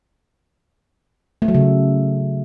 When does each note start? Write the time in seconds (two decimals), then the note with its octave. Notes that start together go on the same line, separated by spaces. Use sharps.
1.42 A3
1.48 F#3
1.55 C#3